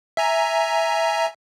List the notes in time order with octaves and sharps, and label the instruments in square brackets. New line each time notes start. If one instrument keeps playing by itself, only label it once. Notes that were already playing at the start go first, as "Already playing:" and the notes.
[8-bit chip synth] E5 G#5 A#5